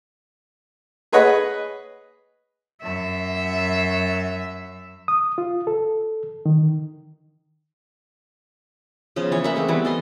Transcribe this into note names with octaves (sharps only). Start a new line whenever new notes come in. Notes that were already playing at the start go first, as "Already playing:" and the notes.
G#4 B4 C#5 D#5 F#5 B5
F#2 E5
D#6
F4
A4
D#3
C#3 F3 B3 C5
E3 G#4 C#5
A#3 E5 F#5
G#3 A3 C4
E3 G3 A3 B3
A4 D#5 C6